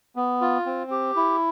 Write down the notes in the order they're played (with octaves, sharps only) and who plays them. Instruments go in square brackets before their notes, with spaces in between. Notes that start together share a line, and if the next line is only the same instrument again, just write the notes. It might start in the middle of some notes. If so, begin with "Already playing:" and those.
[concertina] B3
F4
C4
G4
E4